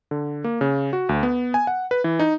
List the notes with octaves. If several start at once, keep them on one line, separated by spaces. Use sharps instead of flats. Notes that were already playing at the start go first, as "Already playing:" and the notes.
D3
A#3
C#3
F#4
D2
B3
G#5
F#5
B4
E3
D#4